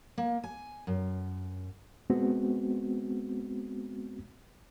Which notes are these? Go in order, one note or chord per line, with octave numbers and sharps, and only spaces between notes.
A#3
G#5
F#2
G#3 B3 C4 F#4